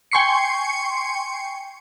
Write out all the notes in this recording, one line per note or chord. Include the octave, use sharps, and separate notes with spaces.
G5 G#5 C6 C#6 C7 C#7